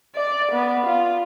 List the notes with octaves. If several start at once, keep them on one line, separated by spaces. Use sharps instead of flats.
D5
B3
F4